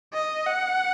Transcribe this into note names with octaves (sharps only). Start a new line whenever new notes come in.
D#5
F#5